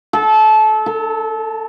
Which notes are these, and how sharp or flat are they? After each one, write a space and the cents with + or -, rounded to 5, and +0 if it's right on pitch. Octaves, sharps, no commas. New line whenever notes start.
A4 -25
A4 +30